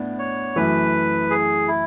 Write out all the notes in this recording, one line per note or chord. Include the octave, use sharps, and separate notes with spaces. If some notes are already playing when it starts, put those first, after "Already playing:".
Already playing: A2 B3 D4
C#5
F#2 E3 A3 B4
G#4
E4